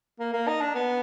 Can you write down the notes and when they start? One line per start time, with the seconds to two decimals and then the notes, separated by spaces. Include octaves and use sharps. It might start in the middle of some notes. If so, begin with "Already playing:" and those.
0.20 A#3
0.33 A#3
0.48 D#4
0.61 D4
0.75 B3